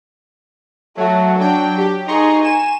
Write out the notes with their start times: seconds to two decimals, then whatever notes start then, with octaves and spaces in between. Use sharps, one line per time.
0.97 F#3 A3 F#4
1.39 F#3 D4 G5
1.78 G4
2.07 D#4 G#4 A#5 C6 C#6
2.44 G#5 E7